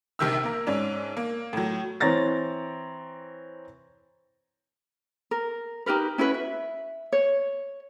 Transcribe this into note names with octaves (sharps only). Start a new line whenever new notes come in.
A#1 C3 D#3 E6
A#3 A#4
G#2 C#4 D4
A#3
A2 F#3
E3 C4 C#5 A#5 A6 A#6
A#4
D#4 G4 A#4 B4
C#4 E4 F#4 B4
E5
C#5